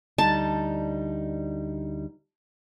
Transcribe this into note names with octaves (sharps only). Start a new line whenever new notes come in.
D2 G3 D#4 A5